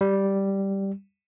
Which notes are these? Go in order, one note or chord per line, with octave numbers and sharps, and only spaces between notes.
G3